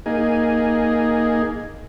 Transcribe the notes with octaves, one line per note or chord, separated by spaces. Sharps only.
A#3 D#4 G#4